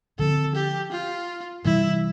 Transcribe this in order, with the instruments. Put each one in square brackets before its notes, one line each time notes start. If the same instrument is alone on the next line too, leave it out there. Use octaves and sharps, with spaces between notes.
[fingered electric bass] D3 F3 C4 [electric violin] A4
[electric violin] G4
F4
[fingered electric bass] C3 E3 G3 [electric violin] E4